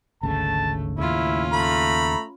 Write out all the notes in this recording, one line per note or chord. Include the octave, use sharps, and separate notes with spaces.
G#1 D2 C#3 A3 A5
D#2 A2 C#3 C#4 E4 F4
A3 A#5 B5